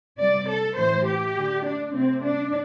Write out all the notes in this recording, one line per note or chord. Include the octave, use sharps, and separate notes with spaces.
C3 G3 D5
A4
A2 E3 A3 C5
G4
D3 A3
D4
C3 A3 C4
D4